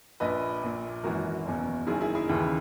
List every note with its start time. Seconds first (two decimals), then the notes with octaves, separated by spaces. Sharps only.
0.20 A#1 A#2 B4 D#5
0.63 A#1 A#2
1.03 G#1 F#2 E3 F#4 A#4
1.45 F#1 E2 B2
1.87 F#1 F#2 D#3 E4 G#4
2.01 E4 G#4
2.15 E4 G#4
2.29 D#2 C#3 E3